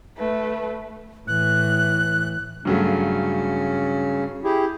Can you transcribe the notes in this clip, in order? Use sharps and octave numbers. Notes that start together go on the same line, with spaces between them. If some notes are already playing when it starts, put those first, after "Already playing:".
A3 B4
A2 E3 F#6
G2 C#3 F#3 A3 C#4
E4 G4 G#4